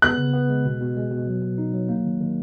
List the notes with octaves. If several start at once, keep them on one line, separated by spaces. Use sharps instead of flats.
B3 F#6
C#3
B3
G#3
B2
B2
G#3
B2
F#3
B2
D#4
F#3
A#3
D#3
D#3